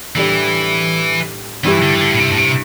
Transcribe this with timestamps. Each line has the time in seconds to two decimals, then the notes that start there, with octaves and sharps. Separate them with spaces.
0.16 A2 E3 G3 D4 G4
1.64 G2 E3 G3 E4 G4
1.82 D3
1.95 E3
2.01 D3
2.11 A2
2.19 C3
2.31 A2
2.38 C3